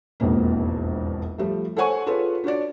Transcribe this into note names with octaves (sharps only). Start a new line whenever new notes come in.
E1 A#1 F2 G#2 B2 A#3
F3 G3 A3
A4 C5 C#5 F#5 G#5 C#6
F4 G#4 A4 B4 C#5
D4 F#4 C#5 D5